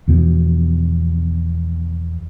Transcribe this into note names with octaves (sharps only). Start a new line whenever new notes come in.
E2 B2 F3